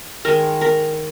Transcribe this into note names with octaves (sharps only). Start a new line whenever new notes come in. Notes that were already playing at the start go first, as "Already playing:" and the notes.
D#3 G#3 A#4
A#4